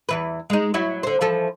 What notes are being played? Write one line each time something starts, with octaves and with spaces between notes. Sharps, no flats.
E2 E3 B4
G#3 D#4
F#3 E4 F#4
D3 C5
E3 F3 A4